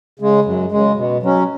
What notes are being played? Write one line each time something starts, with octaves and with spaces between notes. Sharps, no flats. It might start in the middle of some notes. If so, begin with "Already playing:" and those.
C#3 G#3
F#2
C#3 G#3
B2
F#3 C#4